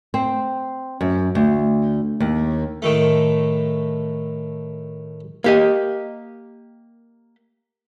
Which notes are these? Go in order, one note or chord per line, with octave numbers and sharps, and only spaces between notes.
C4
F#2
D2
D#2
A2 D#3 A3
A#3 G4 D#5